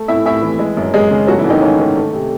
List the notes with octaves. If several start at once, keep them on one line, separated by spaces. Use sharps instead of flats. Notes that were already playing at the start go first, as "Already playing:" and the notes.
Already playing: A3
A2 E4 E5
A2 E4 E5
E3
G#3
F#2
F#2 G#3 G#4
C#3
F#3 A3 F#4
E3 E4
G#2
D#3 D#4
G#2 C#4
D#3
A3
C3